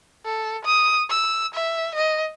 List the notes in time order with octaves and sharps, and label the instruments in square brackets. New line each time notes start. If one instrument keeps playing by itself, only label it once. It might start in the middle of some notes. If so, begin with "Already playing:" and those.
[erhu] A4
D#6
E6
E5
D#5